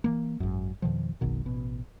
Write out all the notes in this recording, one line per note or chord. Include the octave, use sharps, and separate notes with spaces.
E3 F#3 A#3
G#1 F#2
F2 B2 D#3 F3
F#1 B1 B2 D#3
A1 B2